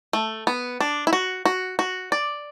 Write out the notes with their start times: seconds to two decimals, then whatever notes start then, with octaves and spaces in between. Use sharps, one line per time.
0.13 A3
0.47 B3
0.80 D4
1.07 E4
1.13 F#4
1.45 F#4
1.79 F#4
2.12 D5